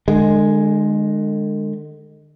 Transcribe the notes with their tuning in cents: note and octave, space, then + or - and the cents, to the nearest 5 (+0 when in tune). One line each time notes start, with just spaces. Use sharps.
D3 +40 G#3 +0